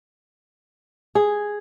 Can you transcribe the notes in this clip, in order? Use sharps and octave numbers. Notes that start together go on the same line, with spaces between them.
G#4